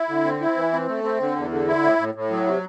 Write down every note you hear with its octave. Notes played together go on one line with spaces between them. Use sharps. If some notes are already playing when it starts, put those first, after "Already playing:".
Already playing: E4
D3
C4
E4
E3
C4
A3
C4
D3
E2
D3
E4
A2
A2
A2
F#3
C3